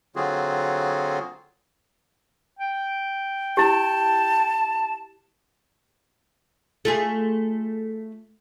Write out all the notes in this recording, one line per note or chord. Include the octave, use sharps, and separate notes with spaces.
D3 F#3 C4 F4 F#4 G#4
G5
E4 G4 A5
A3 F4 G#4